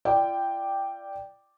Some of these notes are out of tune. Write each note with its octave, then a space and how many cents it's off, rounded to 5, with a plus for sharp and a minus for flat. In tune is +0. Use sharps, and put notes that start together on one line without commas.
F4 -45 D5 +0 G5 +0